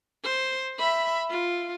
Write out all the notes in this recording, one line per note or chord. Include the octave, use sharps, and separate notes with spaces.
C5
E5 B5
F4